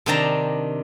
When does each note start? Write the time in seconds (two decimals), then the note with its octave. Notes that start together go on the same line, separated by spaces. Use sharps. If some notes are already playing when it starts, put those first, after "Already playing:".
0.06 C3 D#3 D4 G5 A5 A#5